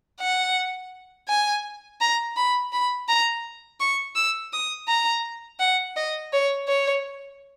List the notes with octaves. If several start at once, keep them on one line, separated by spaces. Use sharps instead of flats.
F#5
G#5
A#5
B5
B5
A#5
C#6
E6
D#6
A#5
F#5
D#5
C#5
C#5